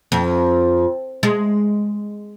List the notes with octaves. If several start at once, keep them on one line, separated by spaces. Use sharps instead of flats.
F2
G#3